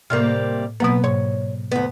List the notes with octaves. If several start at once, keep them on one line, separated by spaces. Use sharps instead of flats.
A2 C3 G3 A#3 F6
B2 F#3 A#3 B3 B4
G#2 C#5
D2 B3